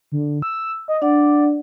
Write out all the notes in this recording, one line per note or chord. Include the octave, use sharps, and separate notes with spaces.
D3
E6
D#5
D4 D5 F#5